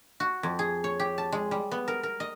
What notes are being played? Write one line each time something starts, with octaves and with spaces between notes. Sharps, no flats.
F#4
F2
G#4
C#5
G4
A5
G#3
G3
B3
A#4
A#4
D#5